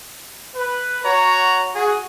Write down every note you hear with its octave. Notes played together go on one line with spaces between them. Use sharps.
B4
F#4 C#5 A#5
F#4 G#4